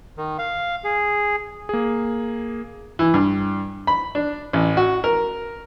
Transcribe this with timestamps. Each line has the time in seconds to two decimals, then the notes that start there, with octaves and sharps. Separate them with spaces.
0.18 D#3
0.39 F5
0.84 G#4
1.69 A#3 G#4
2.99 E3
3.14 G2
3.87 B5
4.15 D4
4.53 A1
4.77 F#4
5.04 A#4